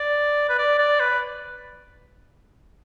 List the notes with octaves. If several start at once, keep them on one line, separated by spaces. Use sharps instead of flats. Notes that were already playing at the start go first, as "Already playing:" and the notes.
Already playing: D5
B4
D5
D5
B4